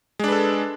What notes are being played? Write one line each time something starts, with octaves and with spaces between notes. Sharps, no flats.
G#3 D4 A4 B4